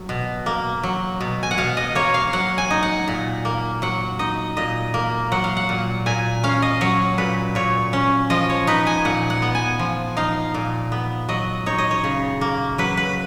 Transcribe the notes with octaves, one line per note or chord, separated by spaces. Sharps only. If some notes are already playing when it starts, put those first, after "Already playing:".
Already playing: F#3
B2
A#3
F#3
B2
G#5
F#5
B2 F5
D#5
A#3 C#5
F5
F#3 F#5
G#5
D#4
F#5
A#2
A#3
F#3 F#5
D#4 D#5
A#2 D#5
A#3
F#3 F#5
F5
F#5
A#2
A#2 G#5
C#4 F5
D#5
F#3 C#5
A#2 B4
A#2 C#5
C#4
F3 D#5
C#5
D#4 B4
G#5
A#2 F#5
F#5
B3
G#5
F3
D#4 F5
A#2
B3
F#3 D#5
D#4 C#5
D#5
C#5
C#3
A#3
F#3 B4
B4